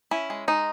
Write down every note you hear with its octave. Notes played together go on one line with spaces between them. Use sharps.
C#4 E4
G#3
G#3 D#4